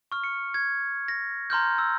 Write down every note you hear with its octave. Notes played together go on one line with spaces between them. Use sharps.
C#6 F6
C#7
G#6
A#6
A#5 C6 F6 G6
E6